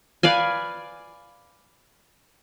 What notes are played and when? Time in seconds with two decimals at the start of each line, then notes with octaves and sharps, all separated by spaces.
0.23 B4 D5 F5 G#5